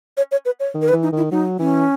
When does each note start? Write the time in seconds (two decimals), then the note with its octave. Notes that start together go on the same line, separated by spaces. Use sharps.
0.17 C#5
0.31 C#5
0.45 B4
0.60 C#5
0.74 D#3
0.82 A#4
0.88 B4
0.93 E3
1.03 D#4
1.12 D#3 E4
1.31 F#3 D#4
1.59 E3 C#4